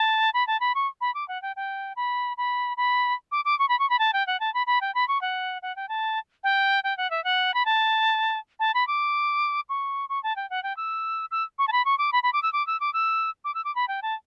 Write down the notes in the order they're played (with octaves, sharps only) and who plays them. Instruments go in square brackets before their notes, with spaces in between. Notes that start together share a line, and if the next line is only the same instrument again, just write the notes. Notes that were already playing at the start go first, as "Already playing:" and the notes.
Already playing: [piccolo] A5
B5
A5
B5
C#6
B5
D6
F#5
G5
G5
B5
B5
B5
D6
D6
C#6
B5
C#6
B5
A5
G5
F#5
A5
B5
B5
G5
B5
C#6
F#5
F#5
G5
A5
G5
G5
F#5
E5
F#5
B5
A5
A5
B5
D6
C#6
C#6
A5
G5
F#5
G5
E6
E6
C#6
A5
B5
C#6
D6
B5
B5
D6
E6
D6
E6
D6
E6
D6
E6
D6
B5
G5
A5